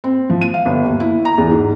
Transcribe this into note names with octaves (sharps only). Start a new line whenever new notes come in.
C4
F3
D#7
F5
G1
D#2
E4
A#5
E2
G#2